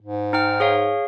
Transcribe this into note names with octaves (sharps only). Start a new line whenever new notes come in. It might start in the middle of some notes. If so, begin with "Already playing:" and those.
G#2
D#4 G5 F6
G#4 C#5 F5